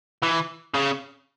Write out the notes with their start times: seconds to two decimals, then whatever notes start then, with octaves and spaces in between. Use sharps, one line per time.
0.23 E3
0.75 C#3